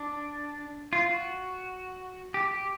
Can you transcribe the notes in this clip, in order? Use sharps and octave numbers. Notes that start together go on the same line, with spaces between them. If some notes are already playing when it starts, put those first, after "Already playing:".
Already playing: D4
F4
F#4
G4
G4